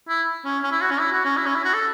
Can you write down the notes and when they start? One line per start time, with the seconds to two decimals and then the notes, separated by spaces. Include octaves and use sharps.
0.08 E4
0.45 C#4
0.63 C#4
0.72 E4
0.81 F#4
0.90 C#4
0.99 E4
1.12 F#4
1.25 C#4
1.37 E4
1.46 C#4
1.55 E4
1.64 F#4
1.73 A4